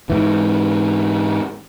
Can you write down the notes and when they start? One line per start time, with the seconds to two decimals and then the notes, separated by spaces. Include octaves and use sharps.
0.10 G#2 E3